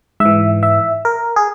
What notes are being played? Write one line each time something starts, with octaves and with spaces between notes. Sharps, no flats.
G#2 E5
E3
E5
A#4
G#4